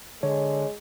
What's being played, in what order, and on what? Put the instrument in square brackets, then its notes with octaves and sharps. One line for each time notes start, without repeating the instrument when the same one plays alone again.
[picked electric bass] D3 [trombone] G#3 [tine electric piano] C#5